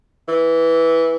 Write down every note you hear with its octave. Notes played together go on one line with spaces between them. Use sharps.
E3